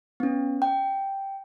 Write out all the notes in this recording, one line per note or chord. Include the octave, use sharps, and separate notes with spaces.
B3 C#4
G5